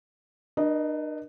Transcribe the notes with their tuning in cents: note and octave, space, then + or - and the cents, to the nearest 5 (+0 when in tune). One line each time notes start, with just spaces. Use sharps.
D4 +40 A#4 +40 D#5 +0